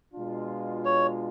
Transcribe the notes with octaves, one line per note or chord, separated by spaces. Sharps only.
B2 G#3 D4 F4
C#5